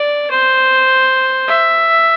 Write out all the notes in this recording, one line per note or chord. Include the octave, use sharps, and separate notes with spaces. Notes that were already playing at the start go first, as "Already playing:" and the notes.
Already playing: D5
C5
E5